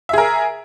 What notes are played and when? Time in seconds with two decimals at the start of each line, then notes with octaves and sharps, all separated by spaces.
0.09 E5
0.13 G#4
0.18 A#4